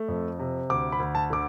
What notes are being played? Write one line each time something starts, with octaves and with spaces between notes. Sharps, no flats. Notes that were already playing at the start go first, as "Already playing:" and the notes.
Already playing: A3
F2
C3
D2 D6
B5
D2
A5
D3 D6